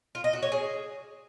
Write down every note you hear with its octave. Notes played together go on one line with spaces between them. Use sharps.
F4
D#5
F#4
C#5
G#4